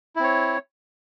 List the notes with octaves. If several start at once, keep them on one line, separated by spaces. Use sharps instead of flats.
C4 E4 C#5